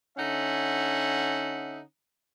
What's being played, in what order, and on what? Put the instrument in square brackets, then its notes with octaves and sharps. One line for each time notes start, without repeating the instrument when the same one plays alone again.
[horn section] D3 C#4 D#4 E5 F#5